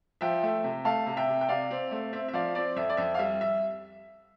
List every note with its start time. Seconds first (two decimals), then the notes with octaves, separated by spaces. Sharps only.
0.21 F3 E5 G5
0.43 A3
0.64 C3
0.85 A3 F5 A5
1.07 C3
1.17 E5 G5
1.27 C3
1.41 G5
1.48 C3 D5 F5
1.71 C4
1.91 A3
2.13 C4 E5
2.28 E5
2.33 F3 D5 F5
2.55 C4 D5
2.76 F2 E5
2.90 D5
2.97 F2 E5
3.14 F5
3.19 G3 E5
3.41 E5